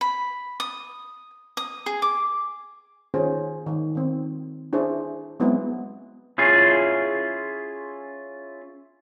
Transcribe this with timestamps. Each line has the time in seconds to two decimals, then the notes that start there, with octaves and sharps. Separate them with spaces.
0.01 B5
0.60 D#6
1.57 D#6
1.86 G#4
2.02 D6
3.14 D#3 C#4 F4 G#4 C5
3.67 D#3
3.95 D#3 C4
4.73 D4 E4 G#4 C5
5.40 F#3 G#3 B3 C4 E4
6.38 C#4 E4 F4 G#4